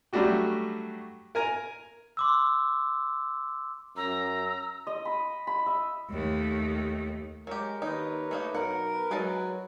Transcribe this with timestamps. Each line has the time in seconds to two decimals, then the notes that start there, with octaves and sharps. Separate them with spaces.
0.13 F#3 G3 A3 D4 F#4 G4
1.35 A#4 G#5 A#5
2.17 C6 D6 E6
3.96 F#2 A#5 E6
4.87 D#5
5.05 B5
5.47 B5
5.66 E5
6.10 D#2 A3
7.47 F#3 G#3 G4 A#4
7.82 D#2 D#4 B4 C#5
8.31 A3 A#3 D#4
8.55 B1 A#4 F#5
8.91 B4
9.11 F#3 G#3 D#4 A5